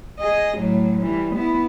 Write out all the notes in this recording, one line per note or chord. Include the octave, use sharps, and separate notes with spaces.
G#4 D#5
A2 F#3
E3 G3
B3 E4